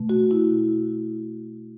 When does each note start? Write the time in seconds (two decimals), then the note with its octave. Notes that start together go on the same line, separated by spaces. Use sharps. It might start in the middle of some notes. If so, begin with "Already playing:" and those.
Already playing: B2 A3
0.09 F#4
0.31 E4